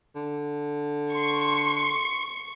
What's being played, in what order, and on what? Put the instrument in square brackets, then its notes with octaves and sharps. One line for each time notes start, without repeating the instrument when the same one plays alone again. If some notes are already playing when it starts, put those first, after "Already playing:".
[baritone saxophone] D3
[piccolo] C6 [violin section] C#6